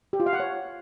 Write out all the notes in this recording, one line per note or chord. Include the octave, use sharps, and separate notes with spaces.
G4
F4
F5
F#5
C#5